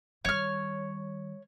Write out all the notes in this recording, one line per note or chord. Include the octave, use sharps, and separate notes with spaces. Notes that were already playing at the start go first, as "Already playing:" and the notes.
D#3 G3 C#5 F6